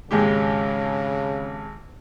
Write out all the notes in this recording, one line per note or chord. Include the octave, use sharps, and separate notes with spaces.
G#1 C#3 G#3 G4